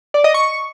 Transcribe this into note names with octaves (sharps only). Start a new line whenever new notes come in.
D5
D#5
C#6